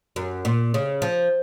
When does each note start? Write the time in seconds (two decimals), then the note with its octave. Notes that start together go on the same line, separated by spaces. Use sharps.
0.16 F#2
0.45 A#2
0.74 C#3
1.02 F3